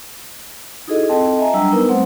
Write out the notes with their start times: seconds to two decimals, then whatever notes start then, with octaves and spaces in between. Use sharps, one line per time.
0.88 D#4 E4 F#4 G#4 A4 D#5
1.09 C4 F4 A4 D#5 G5 A5
1.39 D#5 E5 G#5 A#5
1.53 F#3 G3 D4 G5 A#5 E6
1.72 B3 D#4 A#4 B4
1.89 G3 A3 C4 C5 F#5